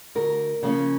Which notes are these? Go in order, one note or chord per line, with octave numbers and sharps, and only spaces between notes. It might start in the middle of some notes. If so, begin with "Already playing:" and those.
D2 A#4
C#3 F3 A#3 C#4